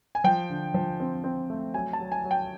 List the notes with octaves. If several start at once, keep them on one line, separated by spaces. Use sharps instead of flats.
G#5
F3 G5
D3
F3
C4
C4
A3
F#3 G#5
A5
F#3
G#5
F#3
G5